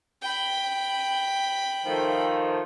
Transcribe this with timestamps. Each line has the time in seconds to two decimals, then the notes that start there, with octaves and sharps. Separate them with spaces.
0.22 G5 B5
1.86 D#3 F3 A3